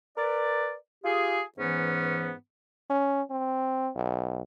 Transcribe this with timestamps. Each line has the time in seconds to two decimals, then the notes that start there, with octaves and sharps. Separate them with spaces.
0.16 A#4 B4 D5
1.04 F4 G4 G#4
1.58 G#2 E3 B3 C#4
2.90 C#4
3.30 C4
3.95 B1